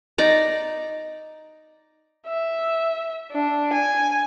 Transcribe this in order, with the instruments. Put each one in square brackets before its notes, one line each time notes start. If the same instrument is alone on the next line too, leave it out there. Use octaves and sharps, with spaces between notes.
[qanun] D#4 D5 A#5
[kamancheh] E5
D4
G#5